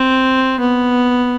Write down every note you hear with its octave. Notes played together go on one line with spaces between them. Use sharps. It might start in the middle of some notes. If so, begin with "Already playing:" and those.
Already playing: C4
B3